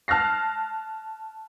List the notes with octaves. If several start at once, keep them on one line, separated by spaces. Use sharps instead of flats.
A5 F6 F#6 A#6 C7